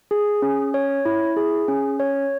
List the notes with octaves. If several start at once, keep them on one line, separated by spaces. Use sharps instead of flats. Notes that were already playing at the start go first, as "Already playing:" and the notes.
G#4
C#4
C#5
E4
G#4
C#4
C#5